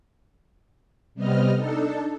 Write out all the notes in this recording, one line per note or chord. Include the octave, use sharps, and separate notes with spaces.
C3 G3 B3 C4 D#5 F6
D4 D#4 A4